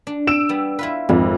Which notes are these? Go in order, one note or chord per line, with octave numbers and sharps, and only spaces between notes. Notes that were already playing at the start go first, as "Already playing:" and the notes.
D4
E6 D7 E7
G3 B3
E4 F4 B4
G#1 F2 G#2